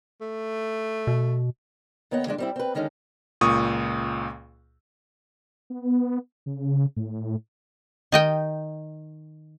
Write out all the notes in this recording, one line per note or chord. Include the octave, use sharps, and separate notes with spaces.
A3
B2
D#2 B3 C#5 D#5 F#5
D3 E3 G#3 D4
G3 C4 E4
C4 B4
D3 D#3 G#3 C#4 D#4
C#2 A#2 C#6 D#6
B3
C#3
A2
D#3 D#5 G5